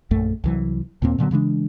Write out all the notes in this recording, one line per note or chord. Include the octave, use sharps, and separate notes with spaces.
A#1 F#2 A3
C2 E3 F#3
D#2 A#2 A#3 C4
A#2 D3 F#3 B3
C#3 E3 G#3 D4